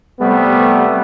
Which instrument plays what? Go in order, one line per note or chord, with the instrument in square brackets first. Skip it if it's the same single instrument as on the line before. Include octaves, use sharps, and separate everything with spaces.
[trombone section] C3 G3 A3 B3